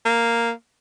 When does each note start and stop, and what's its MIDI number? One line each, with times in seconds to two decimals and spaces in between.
0.05 0.51 58